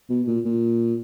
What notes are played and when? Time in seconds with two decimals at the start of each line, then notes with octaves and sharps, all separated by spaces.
0.10 B2
0.27 A#2
0.45 A#2